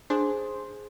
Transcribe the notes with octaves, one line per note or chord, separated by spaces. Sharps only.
D4 G#4 C5